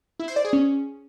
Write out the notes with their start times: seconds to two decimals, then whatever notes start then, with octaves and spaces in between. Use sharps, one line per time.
0.20 E4
0.28 C5
0.36 D5
0.45 G#4
0.53 C#4